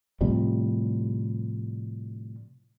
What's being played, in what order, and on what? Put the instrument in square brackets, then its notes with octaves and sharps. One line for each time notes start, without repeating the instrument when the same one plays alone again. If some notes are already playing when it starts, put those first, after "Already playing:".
[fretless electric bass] A2 C3 F3 G3